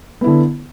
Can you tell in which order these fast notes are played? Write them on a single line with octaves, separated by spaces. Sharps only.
B3 E4 D3